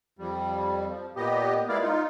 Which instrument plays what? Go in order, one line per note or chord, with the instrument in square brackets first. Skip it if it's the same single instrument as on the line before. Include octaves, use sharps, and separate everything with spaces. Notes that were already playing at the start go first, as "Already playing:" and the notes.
[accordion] F2 G3
F3
A#2 B3 G4 D#5
G#3 A#3 B3 E4 D5 F5
D#4 F4